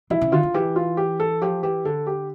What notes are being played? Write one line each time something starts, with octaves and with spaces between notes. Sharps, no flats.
E3 E4
C#3
D3 F4
D3
E3 G4
F4
G4
A4
F3 G4
E3 G4
D3 A4
G4